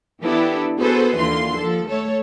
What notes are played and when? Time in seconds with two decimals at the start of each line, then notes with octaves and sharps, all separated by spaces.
0.22 E3 B3 D4 E4 G4 A4
0.79 B3 F#4 G#4 A4 B4 C5
1.18 D#2 D3 E3 F4 C6
1.57 F3 A4
1.88 A3 A4 C#5